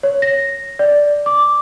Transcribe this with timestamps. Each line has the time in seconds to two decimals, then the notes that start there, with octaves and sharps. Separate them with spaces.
0.03 C#5
0.22 A#6
0.79 D5
1.26 D6